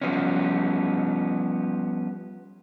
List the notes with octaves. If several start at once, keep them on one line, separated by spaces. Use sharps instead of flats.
F3 G3 B3 C#4